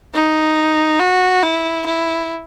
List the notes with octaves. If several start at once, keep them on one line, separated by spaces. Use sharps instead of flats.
D#4
F#4
E4
E4